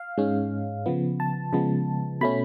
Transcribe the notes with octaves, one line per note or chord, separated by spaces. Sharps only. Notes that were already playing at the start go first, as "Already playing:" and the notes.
Already playing: F5
G#2 G#3 C#4
C#3 F3 B3
A5
C#3 F3 G#3 B3
B2 A3 C#4 B5